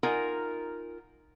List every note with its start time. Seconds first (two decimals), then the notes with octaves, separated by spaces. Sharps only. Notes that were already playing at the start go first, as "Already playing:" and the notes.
0.03 D#4 F4 A#4 F#5 G#5